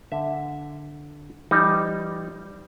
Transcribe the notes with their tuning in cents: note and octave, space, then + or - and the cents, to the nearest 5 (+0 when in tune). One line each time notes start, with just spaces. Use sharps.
D3 +0 E5 +0
E3 +40 G3 +0 D#4 +0